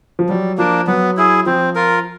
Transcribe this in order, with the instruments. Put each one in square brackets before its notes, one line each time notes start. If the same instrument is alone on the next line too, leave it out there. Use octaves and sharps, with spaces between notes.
[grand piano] F3
[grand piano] F#3 [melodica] G3
[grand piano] F3 [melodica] A#3 D4
[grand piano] F#3 [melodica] B3
[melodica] E4 G#4
[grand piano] F3 [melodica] C4
[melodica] F4 A#4